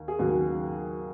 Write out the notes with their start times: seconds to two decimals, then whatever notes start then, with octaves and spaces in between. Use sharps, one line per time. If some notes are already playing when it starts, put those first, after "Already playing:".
Already playing: D#2
0.08 G#4
0.19 D#2 C#3 F#3 F#4